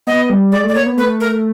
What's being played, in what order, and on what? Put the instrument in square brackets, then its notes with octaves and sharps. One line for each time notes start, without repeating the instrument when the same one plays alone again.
[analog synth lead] B3 [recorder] D#5
[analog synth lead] G3
[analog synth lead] G#3 [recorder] D5
[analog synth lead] A3 [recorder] D5
[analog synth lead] A#3 [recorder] C#5
[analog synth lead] B3
[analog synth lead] A3 [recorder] B4
[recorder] A#4